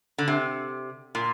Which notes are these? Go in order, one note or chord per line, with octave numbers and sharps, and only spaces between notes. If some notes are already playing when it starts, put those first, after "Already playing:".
D3
C3
A#2